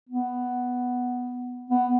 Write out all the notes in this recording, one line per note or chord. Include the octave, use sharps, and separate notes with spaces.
B3
B3